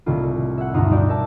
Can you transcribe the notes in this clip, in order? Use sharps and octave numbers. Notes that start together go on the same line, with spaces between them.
C2 A2 D#3 A3 F4
E5 F#5
D2 G2 B2 D#4 F4 A#5
G3 D#4 F#4 D5 G6
A#4 E5 A5